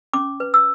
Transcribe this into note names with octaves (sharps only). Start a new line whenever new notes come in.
C#4 D6
B4
E6